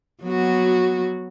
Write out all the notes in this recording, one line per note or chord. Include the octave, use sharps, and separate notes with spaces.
F#3 B3 F#4